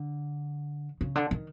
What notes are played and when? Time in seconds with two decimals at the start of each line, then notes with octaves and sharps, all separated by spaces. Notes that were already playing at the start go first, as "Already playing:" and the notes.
Already playing: D3
1.01 C#3
1.15 D3
1.31 D#3